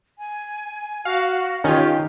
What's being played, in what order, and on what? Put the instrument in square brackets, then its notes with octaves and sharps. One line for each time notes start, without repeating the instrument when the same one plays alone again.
[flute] G#5
[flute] F#4 [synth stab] F5
[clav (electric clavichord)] D#3 [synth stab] C#4 F4 [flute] G4